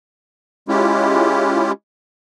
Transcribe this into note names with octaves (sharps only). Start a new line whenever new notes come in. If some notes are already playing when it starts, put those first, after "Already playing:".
G#3 C#4 E4 F4 G4